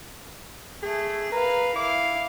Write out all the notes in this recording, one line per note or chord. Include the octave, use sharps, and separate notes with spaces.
A3 G#4
A#4 B4 F5
E4 F5 D6